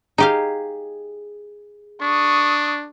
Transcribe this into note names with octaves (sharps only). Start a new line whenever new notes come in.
D#4 G4 G#4 F5
D4 C#6 D#6